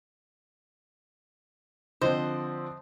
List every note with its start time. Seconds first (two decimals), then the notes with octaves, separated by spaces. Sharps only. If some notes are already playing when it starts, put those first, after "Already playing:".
2.01 D3 F3 C4 C5 D#5